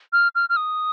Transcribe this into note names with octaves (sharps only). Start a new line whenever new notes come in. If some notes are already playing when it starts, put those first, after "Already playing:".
F6
F6
F6
D#6